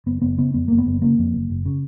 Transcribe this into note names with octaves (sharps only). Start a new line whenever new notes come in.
F#1 B3
F#1 B3
C#3 B3
F2 B3
F#1 A#3
B3
F#1
C#3 A#3
F2
F#1
F#1
C#3